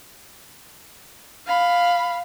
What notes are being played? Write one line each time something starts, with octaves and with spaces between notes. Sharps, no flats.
F5 B5